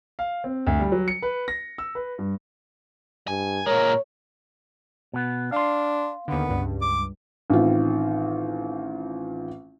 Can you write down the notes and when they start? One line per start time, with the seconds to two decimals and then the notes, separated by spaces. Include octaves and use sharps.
0.19 F5
0.44 C4
0.67 D2
0.79 G3
0.92 F#3
1.08 C#7
1.22 B4
1.48 A#6
1.78 E6
1.95 B4
2.18 G2
3.28 G2 G#5
3.67 A#2 G#3 A#4 C#5
5.14 B2 B3
5.52 D4 F5 C6
6.28 D#2 D3 B3
6.49 C#2 G2
6.82 D6
7.50 A1 D#3 C4 F4